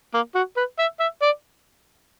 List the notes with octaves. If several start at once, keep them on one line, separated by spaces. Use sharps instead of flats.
A#3
F#4
B4
E5
E5
D5